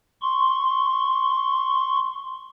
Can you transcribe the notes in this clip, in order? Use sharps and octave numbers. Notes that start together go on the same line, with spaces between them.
C6 C#6